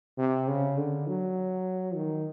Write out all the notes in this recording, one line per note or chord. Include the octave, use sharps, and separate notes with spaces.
C3
C#3
D3
F#3
D#3